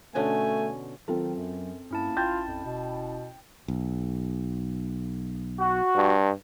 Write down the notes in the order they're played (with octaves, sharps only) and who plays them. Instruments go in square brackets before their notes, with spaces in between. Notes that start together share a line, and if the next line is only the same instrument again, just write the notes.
[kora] B2 D3 C#4 [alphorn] A3 [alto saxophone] G#5
[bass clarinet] D#3 [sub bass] F#3 [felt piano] C4 F4 A4
[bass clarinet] F#2
[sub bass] G2 [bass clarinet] A#3 [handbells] C#4 E4 A5
[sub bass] A1 [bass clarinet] F4 [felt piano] G5 G6 A6
[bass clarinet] F2
[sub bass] E1 [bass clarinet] B2
[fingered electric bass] B1
[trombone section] F#4
[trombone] G2